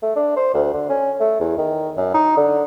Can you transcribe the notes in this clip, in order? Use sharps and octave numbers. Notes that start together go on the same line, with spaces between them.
A3
D4
C5
D2
D3
C#4
A3
E2
D#3
F#2
D#4
D3